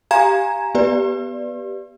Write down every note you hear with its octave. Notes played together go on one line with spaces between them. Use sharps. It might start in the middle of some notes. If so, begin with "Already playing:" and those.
G4 F5 G#5 A#5 G#6 E7
B3 G4 B4 D5